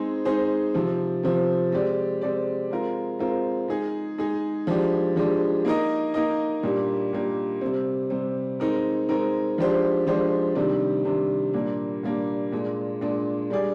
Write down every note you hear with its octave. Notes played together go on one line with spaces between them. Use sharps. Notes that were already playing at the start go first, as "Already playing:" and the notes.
Already playing: G#3 C4 D#4 G#4 C5
G#3 C4 D#4 G#4 C5
C3 F3 C4
C3 F3 C4
G#3 C4 G4 D5
G#3 C4 G4 D5
G#3 C4 F4 A#4
G#3 C4 F4 A#4
G#3 D#4 G#4
G#3 D#4 G#4
F3 G#3 D4 G4
F3 G#3 D4 G4
A#3 D#4 A#4 D#5
A#3 D#4 A#4 D#5
A#2 G3 A#3 D4 G4
A#2 G3 A#3 D4 G4
C3 G3 C4
C3 G3 C4
G#3 C4 D#4 A#4
G#3 C4 D#4 A#4
F3 G#3 D4 G4 C5
F3 G#3 D4 G4 C5
C3 D#3 G3 D4
C3 D#3 G3 D4
A#2 G3 A#3 D4
A#2 G3 A#3 D4
A#2 G#3 D4
A#2 G#3 D4
G3 D4 G#4 D5